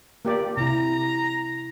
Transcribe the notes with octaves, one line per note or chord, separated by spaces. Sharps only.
A#3 G4 D5
C3 E4 A#5